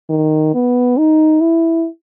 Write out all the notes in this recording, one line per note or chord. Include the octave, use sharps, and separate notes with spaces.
D#3
B3
D#4
E4